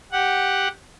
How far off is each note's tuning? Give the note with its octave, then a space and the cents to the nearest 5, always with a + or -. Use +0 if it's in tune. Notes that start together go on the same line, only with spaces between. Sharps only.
G4 +0 F#5 +0